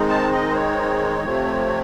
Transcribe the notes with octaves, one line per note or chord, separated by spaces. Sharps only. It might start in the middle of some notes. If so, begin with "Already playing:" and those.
Already playing: D#3 G#3 C4 D#4
A5
D#5
C5
C#5
C3 F3 A3 C4